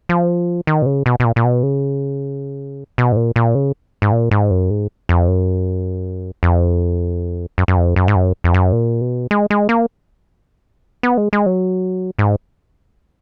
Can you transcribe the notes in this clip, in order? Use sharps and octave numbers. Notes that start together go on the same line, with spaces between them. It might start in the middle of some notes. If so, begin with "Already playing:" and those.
F3
D#3
B2
C#3
B2
B2
A#2
A#2
B2
C#3
B2
G#2
A#2
A#2
C#3
G#2
A#2
G#2
F#2
G#2
F2
F#2
F2
F#2
F#2
F2
F#2
G#2
F#2
F2
F#2
A#2
B2
G#3
G#3
A#3
B3
G#3
G#3
F#3
G#2